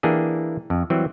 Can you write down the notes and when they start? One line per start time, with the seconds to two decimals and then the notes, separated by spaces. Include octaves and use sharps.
0.03 E3 A#3 D4 G4 G#4
0.70 F2
0.90 E3 F#3 G3 C4